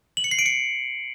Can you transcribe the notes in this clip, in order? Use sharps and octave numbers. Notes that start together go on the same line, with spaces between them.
F#7
C#7
C7
D7
C#7